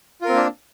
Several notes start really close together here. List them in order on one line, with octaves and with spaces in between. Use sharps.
F4 A#4 C4 A#3 D4